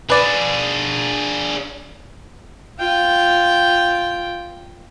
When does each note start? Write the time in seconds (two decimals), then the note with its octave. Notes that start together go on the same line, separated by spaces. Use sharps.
0.10 D4 G#4 B4 D5
2.79 F4 G5